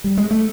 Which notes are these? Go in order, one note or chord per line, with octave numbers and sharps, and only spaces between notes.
G3
G#3
A3